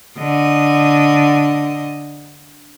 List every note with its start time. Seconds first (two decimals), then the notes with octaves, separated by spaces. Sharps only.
0.18 D3 D#5